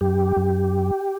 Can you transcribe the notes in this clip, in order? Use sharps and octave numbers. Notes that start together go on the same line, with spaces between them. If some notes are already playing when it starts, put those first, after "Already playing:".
F#2 G4
F#2